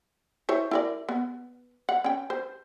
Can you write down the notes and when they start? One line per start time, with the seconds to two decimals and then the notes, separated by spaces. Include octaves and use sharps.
0.49 E4 C5 C#5
0.71 E4 A#4 D5
1.09 B3
1.89 F#5
2.04 C#4 G5
2.30 C5